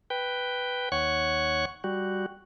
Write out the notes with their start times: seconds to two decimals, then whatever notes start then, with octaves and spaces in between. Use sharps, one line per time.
0.10 B4 G5
0.92 D#2 C#5 F#5 C#6
1.84 G3 F#4